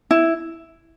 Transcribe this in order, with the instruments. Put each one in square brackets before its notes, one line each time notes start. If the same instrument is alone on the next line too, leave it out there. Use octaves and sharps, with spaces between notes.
[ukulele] E4